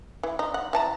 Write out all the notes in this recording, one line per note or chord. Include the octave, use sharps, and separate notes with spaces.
E3
D#4
F#5
E3 A5 A#5